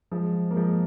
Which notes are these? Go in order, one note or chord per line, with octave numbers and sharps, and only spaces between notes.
F3 G#3
A#3
F3 G#3